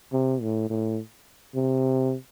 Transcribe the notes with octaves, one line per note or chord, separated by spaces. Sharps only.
C3
A2
A2
C3